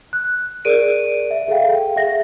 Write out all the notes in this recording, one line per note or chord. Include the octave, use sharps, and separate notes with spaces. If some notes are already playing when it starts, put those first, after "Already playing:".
F#6
G#4 A#4 D5 D7 D#7
E5
G#4 A4 F5 G5
G#4 E5 F#5 A#6